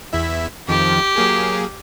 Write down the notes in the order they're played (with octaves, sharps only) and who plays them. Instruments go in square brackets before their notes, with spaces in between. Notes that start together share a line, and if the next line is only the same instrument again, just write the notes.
[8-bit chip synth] E2 E4 E5
[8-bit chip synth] F2 D#3 F3 [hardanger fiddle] G4
[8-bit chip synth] F#3 A#3 G#4